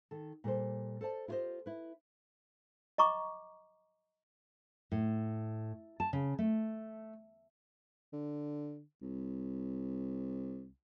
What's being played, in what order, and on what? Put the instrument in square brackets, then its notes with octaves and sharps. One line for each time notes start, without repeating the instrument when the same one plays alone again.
[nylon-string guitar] D#3 A4
A#2 G3 A4 C5
A4 C5 D5 A5
E4 F4 G4 A4 C5 D#5
E4 B4
[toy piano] D#5 A#5 C#6 D6
[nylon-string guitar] A2
A5
C#3
A3
[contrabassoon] D3
C2